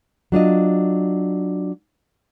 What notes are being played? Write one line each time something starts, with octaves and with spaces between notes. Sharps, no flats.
F#3 D4 F4 D#5